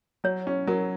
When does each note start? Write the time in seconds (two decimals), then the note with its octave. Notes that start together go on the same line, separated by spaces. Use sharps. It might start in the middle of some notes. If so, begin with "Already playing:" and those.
0.24 F#3 C#5
0.47 C#4
0.67 F#3 A#4